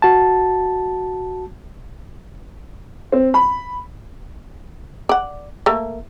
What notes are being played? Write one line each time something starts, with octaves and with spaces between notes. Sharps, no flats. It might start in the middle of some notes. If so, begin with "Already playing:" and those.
F#4 A5
C4
B5
D5 F#5
A3 A#3